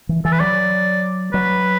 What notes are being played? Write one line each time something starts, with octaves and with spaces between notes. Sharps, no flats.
E3
E3 A4
B4
F#3 D5
F#3 B4